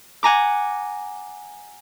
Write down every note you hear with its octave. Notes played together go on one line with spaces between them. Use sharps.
F#5 G#5 A#5 D6